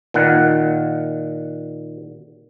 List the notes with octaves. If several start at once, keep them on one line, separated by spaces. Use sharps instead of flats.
A#2 D#3 F#5